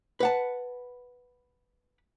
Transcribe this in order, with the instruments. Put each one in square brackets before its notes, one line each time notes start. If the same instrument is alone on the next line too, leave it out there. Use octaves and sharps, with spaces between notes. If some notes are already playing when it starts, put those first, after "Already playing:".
[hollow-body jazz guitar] B4 F#5 A5